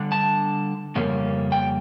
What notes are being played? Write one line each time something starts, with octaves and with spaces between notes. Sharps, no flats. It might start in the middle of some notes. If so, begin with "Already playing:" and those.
Already playing: D3 G3 D4
A5
F2 C#3 G3 A#3 C#4
G5